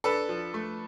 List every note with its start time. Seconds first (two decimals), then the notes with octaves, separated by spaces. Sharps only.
0.04 D4 A4 B4
0.29 F3
0.54 A3